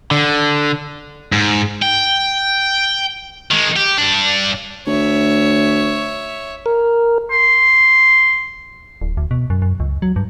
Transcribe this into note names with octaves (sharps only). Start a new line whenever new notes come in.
D3
G#2
G5
D#3 G#3
G4
G2 D4
D2 C#5 E5
A#4
C6
D1
D2
B2
F#2
F#2
C#2
F#3
G2